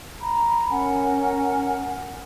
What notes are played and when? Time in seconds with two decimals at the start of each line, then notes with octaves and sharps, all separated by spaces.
0.21 A#5 B5
0.70 C#4 A#4 F#5 G#5